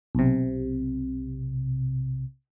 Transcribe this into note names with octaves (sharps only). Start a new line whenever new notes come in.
B1 C3